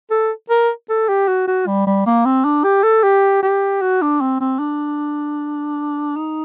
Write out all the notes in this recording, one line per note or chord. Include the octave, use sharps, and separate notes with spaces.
A4
A#4
A4
G4
F#4
F#4
G3
G3
A#3
C4
D4
G4
A4
G4
G4
F#4
D4
C4
C4
D4
D#4